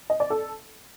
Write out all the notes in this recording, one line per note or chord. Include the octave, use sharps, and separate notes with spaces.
D#5
D5
A4